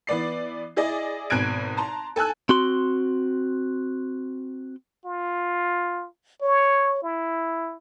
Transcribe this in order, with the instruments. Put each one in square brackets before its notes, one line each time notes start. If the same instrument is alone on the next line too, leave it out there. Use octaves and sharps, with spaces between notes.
[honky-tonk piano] E3 B3 D5 C7
E4 G#4 D5 D#5
G#1 B2 F#6 G#6 D7
A5 A#5 C6
A4 G#5 E6 F#6
[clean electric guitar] C4 F#4 C6
[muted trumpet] F4
C#5
E4